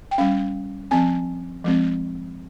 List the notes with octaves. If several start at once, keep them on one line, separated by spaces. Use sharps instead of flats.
G5
G3 C#4 F5
F3 C4 G#5
F3 G#3 C4